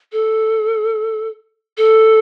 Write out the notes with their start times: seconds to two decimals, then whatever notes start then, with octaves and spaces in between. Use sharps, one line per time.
0.12 A4
1.78 A4